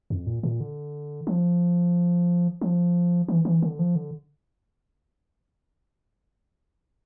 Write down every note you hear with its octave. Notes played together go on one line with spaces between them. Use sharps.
F2
A#2
A#2
D3
F3
F3
E3
E3
D3
F3
D3